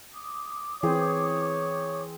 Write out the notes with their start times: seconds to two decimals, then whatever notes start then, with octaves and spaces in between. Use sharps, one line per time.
0.14 D6 D#6
0.83 E3 C4 G#4 C#5